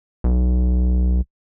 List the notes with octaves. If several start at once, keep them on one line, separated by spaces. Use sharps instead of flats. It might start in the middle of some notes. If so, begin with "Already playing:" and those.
B1